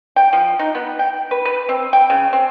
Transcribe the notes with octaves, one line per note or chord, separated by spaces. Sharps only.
G5
F3
D#4
B3
G5
B4
B4
C4
G5
C#3
C4